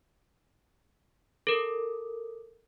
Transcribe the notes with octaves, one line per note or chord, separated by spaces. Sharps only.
A4 A#4